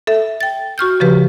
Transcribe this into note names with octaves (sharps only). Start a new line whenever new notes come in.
A4 E5
G5 A6
F#4 C#6 F6 G6
C#3 F3 G4 B4